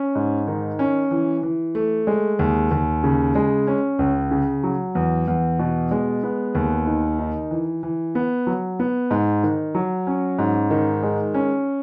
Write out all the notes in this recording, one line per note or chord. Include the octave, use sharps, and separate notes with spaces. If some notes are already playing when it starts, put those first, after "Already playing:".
Already playing: C#4
G#2
D#3
C#4
E3
E3
A3
G#3
D#2
D#2
C#3
G#3
C#4
C#2
C#3
F#3
E2
E2
B2
G#3
B3
D#2
D#3
D#4
E3
E3
B3
F#3
B3
G#2
D#3
F#3
C#4
G#2
D#3
G#3
C#4